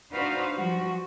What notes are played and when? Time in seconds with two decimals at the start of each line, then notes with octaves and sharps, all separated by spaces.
0.13 D4 D#4 F#4 B4 C5 F5
0.56 F3 G3 F#4